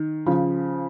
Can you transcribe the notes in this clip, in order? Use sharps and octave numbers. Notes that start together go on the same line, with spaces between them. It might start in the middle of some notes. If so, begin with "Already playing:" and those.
Already playing: D#3
C#3 F3